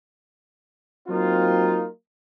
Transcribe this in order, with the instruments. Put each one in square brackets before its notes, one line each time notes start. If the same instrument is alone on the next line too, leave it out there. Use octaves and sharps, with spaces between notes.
[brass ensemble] F#3 A#3 C4 D#4 F4